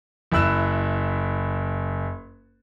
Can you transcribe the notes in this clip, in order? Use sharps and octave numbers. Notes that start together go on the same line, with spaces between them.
F#1 E4 E6 F#6 E7